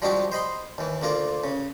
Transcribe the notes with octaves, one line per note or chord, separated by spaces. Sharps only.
F3 G3 G#3 D4 F#4 G4
C5 D#5 B5 C6
D#2 E3
D2 A#3 F4 A#4 D5
C#3